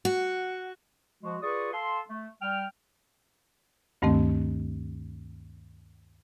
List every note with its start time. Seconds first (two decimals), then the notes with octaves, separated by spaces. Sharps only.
0.05 F#4
1.23 F3 G#3 F#4
1.42 F4 G#4 B4 D5 C#6 D#6
1.72 A4 F5 A5 C6
2.08 A3
2.41 G3 G5 F6
4.02 D2 G2 D#3 A3 C4